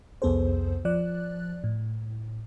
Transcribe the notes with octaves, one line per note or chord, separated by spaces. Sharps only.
C2 F2 B3 G#4 A4 C5
F3 D5 F#6
A2